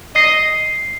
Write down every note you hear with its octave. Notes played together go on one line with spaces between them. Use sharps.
D#5 C7